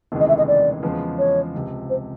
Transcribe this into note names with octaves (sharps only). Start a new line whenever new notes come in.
F1 D#2 C#3 E3 G#3
D#5
E5
D#5
D5
E2 C#3 F3 G#3 B3
C#5
C#2 C3 F3
C5